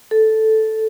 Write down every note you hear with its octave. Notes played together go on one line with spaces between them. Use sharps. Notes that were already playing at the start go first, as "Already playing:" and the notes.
A4